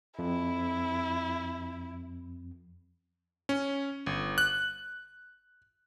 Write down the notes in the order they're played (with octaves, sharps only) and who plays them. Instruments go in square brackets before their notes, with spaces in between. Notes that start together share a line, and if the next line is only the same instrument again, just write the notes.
[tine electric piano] F2 [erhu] E4
[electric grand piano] C#4
G1
F#6